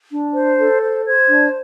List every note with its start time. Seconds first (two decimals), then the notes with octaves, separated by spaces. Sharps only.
0.11 D4
0.34 C5
0.58 A4
0.81 C5
1.05 C5 G#6
1.28 D4